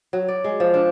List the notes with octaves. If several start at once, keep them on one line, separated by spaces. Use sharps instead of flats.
F#3
D5
G#3
F3
D4